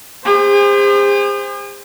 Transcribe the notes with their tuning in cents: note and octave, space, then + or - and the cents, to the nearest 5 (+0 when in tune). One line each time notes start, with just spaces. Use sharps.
G#4 -45 C5 +0